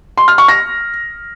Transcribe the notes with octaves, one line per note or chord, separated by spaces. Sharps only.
C6
F6
C#6
A#6